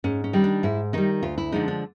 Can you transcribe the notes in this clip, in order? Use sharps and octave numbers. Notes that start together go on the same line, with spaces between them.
G#2 C#4
C#4
D#3 G3
D4
G#2 E4
D#3 G3 D#4
D2 F4
E4
D3 F3 G#3 D#4
D4